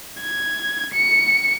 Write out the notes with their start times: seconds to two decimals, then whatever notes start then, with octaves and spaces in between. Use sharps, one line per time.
0.21 G#6
0.94 C#7